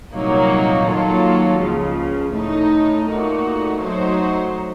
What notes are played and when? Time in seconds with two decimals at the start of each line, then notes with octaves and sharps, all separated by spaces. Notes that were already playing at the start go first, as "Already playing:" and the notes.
0.14 C2 A#2 F#3 A#3 D#4
0.87 D#3 F#3 A#3 F4 A4
1.61 C#2 C#3 F3
2.33 A2 A3 D#4
3.07 A#2 A3 D#4 F#4
3.79 F#3 A3 D#4 F#4 C5